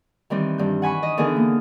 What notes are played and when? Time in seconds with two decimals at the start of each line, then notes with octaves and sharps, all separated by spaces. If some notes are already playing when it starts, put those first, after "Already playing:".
0.30 D#3 E3 G3 C4
0.58 G2 G6
0.82 F#5 G#5 B5 C#6
1.03 D#5
1.17 D3 E3 B3 D#4 G#4 A#4
1.36 A#3